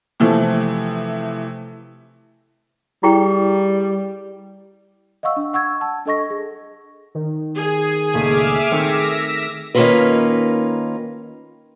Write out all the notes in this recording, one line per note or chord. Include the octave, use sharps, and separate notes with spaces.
C3 E3 F3 A3
G3 E4 G#4 G5
D#5 F5 F#5 C#6 E6
D4
F#5 C#6 E6 G#6
A5
D4 A4 D#5 C#6 A#6
G#4
D#3
G#4
C#2 A#2 A3 E5 D6 F6
D#3 A3 C4 E6 A#6 B6 C#7
D#3 A#3 C#4 D#4 F4 B4